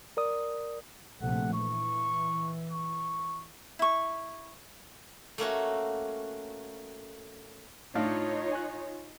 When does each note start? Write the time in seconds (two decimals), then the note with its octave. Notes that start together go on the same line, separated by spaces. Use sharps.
0.17 A#4 D5 D#6
1.22 A#1 C3 A3 F#5
1.53 E3 C#6
2.71 C#6
3.79 E4 C#6
5.38 A3 A#3 C#4 F#4
7.95 A2 D4 D#4 F4 C#5 F5
8.52 G#5 F#6